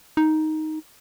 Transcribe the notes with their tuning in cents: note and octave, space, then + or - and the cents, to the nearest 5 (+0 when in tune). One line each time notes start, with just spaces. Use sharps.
D#4 +5